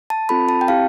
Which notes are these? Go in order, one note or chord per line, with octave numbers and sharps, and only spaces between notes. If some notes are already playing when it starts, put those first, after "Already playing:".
A5
C4 F4 A4 B5
A5
G5
C4 E4 G4 F5